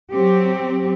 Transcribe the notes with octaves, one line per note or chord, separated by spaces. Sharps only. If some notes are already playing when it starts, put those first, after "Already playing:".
F#3 C4 G4